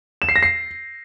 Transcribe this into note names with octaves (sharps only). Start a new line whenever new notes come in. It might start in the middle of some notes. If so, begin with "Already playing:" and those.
E7
C7
A#6
C7